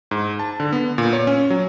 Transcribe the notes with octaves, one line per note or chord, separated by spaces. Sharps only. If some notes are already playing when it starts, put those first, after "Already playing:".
G#2
A5
D3
B3
A#2
C#5
C#4
F#3